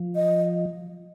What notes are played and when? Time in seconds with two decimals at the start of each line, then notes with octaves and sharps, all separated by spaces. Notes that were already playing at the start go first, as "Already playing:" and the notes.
Already playing: F3
0.16 D#5